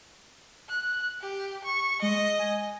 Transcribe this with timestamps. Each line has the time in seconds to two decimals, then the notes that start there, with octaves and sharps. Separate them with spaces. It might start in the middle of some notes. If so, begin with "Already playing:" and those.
0.69 F#6
1.21 G4
1.65 C#6
2.02 G#3 D#5
2.39 G#5